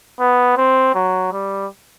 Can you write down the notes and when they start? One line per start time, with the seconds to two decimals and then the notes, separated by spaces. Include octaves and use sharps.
0.20 B3
0.57 C4
0.95 F#3
1.33 G3